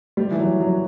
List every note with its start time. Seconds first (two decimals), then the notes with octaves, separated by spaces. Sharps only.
0.17 G3
0.31 E3
0.39 F#3
0.60 F#3